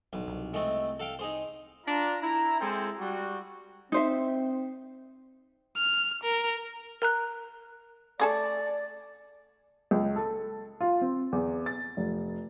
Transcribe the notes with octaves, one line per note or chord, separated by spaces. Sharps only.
D1 B1
C2
G#3 A3 C4
A4 F5 G5
D#4 G#4 C5
D4 F4 A#5
E4 A#5
G#3 C4 E4 A4 C5 G5
G3 F#4
C4 D#4 C5 E5
F6
A#4
A#4 A#5 F#6
A3 G#4 A4 D5
C#2
A4
F4
C4
E2
A6
F1